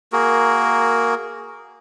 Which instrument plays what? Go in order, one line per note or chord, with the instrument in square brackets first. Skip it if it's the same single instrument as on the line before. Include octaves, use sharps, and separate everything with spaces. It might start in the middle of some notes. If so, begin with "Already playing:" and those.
[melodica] A#3 F#4 G#4 A#4